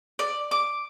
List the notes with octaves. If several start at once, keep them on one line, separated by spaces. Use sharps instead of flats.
D5
D6